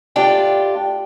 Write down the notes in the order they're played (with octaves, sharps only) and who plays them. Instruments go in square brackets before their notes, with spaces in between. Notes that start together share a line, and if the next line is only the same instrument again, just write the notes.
[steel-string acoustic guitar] A2 D4 F4 G4 G5